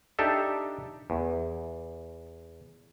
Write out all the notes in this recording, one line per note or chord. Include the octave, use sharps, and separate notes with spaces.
D4 D#4 G4 A4 E5
E2